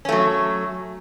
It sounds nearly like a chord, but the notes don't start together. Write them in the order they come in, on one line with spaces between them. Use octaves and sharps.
C#4 A3 F#3